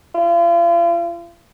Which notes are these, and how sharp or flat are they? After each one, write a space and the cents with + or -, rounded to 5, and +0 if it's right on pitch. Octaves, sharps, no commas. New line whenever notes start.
F4 -40